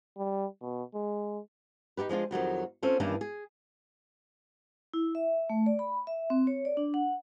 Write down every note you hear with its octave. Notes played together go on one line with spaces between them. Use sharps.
G3
B2
G#3
D#4 E4 G4 B4
F3 G#3 D4 F4
F2 D#3 F#3 G3
C4 C#4 F4 A4
G2 D#3 E3 A#3 C#4 D4
G#4
E4
E5
A3
D5
B5
E5
C4
C#5
D5
D4
F#5